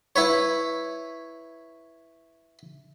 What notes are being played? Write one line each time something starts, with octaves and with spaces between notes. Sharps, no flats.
E4 B4 C#5